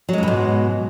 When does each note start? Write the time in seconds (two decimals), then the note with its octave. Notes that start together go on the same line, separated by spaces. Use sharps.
0.09 F#3
0.13 G#3
0.18 F2
0.23 B2
0.28 G#2